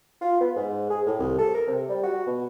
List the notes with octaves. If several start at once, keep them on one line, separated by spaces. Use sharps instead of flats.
F4
B3
G#2
G#4
A2
C2
A4
A#4
C3
G3
F#4
B2